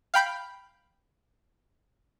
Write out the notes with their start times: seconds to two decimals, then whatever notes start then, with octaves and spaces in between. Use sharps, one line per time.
0.14 F5 G5 B5 G6